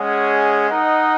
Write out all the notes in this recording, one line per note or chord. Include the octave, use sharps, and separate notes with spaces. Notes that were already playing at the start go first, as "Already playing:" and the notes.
Already playing: G#3 C#4 G#4 C#5 F#5
D#4 A#4 D#5 F#5